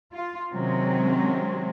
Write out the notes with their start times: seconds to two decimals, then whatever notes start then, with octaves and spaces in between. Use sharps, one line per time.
0.13 F4
0.52 C3 D#3 F#3 G#3 C4 C#4